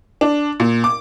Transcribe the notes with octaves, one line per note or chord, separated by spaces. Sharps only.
D4
A#2
D6